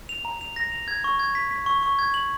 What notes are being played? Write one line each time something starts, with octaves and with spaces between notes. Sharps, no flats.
F7
A#5
F7
A#6
F7
G#6
C#6
G#6
B6
B6
C#6
C#6
G#6
F#7